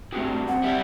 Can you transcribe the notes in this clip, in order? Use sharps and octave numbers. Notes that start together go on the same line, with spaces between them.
G2 F#3 A3 C4 G#4
C4 F#5
G3 E4